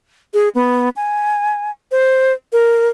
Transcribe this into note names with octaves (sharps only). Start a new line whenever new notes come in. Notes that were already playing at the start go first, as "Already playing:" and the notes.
G#4
B3
G#5
C5
A#4